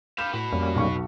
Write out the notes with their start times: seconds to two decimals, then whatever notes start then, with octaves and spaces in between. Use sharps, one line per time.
0.18 B4 F5 G6 E7
0.33 A2 F#4 B4
0.52 F2 G3 A#3 C#4
0.75 B1 C#6